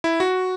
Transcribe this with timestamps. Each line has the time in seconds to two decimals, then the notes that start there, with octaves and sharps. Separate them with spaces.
0.04 E4
0.20 F#4